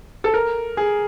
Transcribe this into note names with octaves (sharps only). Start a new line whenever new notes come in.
A4
A#4
G#4